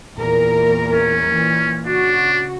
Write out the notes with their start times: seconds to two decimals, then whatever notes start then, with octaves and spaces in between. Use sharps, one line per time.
0.16 E2 A#2 A#4
0.93 C#4
1.29 A#2 E3
1.86 C#3 D4 F#4